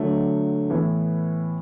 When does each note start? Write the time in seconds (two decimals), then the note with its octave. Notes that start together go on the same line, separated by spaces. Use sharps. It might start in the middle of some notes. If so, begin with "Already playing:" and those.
Already playing: D3 F#3 A3
0.70 A2 E3 B3 E4